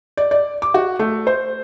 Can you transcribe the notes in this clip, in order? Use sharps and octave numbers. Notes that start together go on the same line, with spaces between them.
D5
D5
D6
F#4
A3
C5